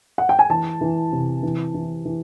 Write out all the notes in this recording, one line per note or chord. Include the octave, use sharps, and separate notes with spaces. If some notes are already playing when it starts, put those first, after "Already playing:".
F#5
G5
G#5
E3 A5
E3
C3
E3
E3
E3